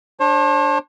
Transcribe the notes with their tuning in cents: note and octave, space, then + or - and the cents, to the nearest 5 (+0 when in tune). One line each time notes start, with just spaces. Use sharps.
D4 +0 C5 +45